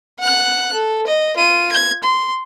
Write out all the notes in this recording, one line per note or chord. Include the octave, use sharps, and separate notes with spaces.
F#5 F#6
A4
D#5
F4 D#7
G#6
C6